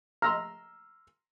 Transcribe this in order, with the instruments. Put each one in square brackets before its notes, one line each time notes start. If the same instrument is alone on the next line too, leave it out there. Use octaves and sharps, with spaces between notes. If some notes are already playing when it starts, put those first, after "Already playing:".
[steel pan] A#5 [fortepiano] C6 E6 F6